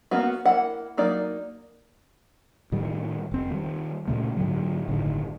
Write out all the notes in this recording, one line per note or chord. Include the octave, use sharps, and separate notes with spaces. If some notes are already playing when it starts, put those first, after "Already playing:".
A#3 B3 C#4 F#4
A#3 E4 F#5
F#3 A#3 D#4 D5
A2 D#3 G3
F1 C4
D#3 G3
A#2 C#3 A3
G#2 D3 F#3
G1 A2 D3 D#3